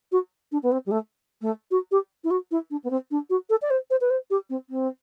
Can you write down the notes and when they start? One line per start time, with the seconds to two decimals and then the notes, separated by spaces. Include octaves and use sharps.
0.12 F#4
0.52 D4
0.63 B3
0.72 C4
0.86 G3
0.91 A3
1.41 A3
1.71 F#4
1.91 G4
2.24 E4
2.30 F#4
2.51 E4
2.70 D4
2.84 B3
2.90 C4
3.11 D4
3.30 F#4
3.50 A4
3.62 D5
3.70 C5
3.90 C5
4.01 B4
4.10 C5
4.30 G4
4.49 C4
4.69 C4